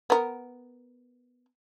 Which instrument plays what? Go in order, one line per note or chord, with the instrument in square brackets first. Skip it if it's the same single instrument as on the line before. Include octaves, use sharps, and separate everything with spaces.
[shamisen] B3 A#4